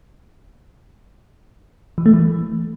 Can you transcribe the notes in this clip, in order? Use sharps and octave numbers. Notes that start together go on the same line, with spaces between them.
E3
A3
E3